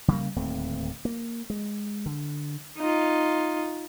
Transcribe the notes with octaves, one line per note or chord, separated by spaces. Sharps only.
C#3 G3 G#3 A#3
D1 D#2 A3 C4
A#3
G#3
D3
D#4 F4